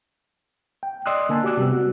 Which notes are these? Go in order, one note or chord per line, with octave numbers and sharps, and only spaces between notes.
G5
D5 D#5 C6 D#6 E6 F#6
D3 A#3 G#5 A5
F#4 G4 D5 D6 E6 F#6
C3 G3 B3
F#4